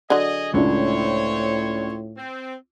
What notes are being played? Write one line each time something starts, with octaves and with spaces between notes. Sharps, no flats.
D3 F#3 G#4 D#5
C#2 A2 C4 D4 E4 C5 C#5
C4